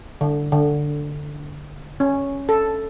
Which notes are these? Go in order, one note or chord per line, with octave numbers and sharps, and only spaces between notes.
D3
D3
C#4
A4